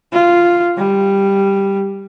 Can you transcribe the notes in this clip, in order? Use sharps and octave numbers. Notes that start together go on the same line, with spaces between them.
F4
G3